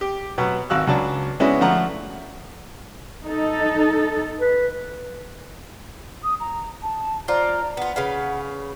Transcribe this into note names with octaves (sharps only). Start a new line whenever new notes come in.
G4
B2 F#3 B3
G#1 F#4 F5 E6 F#6
C#2 F#3 D4 F#4 A5 C#6
G#3 B3 C#4 D4 E4 F#4
D3 F3 A3 F4 F#5 A#5
D#4 A4
B4
D#6
A#5
A5
F4 C5 D5 A#5
B3 F4 F#5
C#3 B4 F5